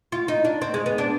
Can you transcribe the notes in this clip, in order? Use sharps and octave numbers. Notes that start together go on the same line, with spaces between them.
F4
D#4
D4
C4
G#3
B3
D4